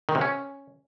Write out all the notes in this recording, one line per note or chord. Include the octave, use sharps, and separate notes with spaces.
D#3
C3
C#4